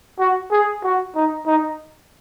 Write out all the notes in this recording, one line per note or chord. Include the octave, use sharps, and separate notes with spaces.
F#4
G#4
F#4
D#4
D#4